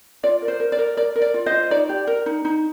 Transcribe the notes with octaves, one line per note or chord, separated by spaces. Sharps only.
F4 D5
A#4
C5
A#4
D5
A#4
A#4 D5
A#4
D5
F4
C5 D#5
F4
D#4 D5
G4
A#4
D#4
D#4